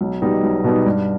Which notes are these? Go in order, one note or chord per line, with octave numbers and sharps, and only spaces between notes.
B1
B2 G3 B3 D#4
B1
B2 G3 B3 D#4
G2